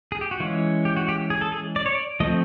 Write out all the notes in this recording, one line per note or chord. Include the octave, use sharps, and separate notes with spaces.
G#4
G4
F#4
E3 G#3 C#4 F4
G4
F#4
G4
G#4
A4
G#4
D5
C#5
D5
F3 A3 C4 D#5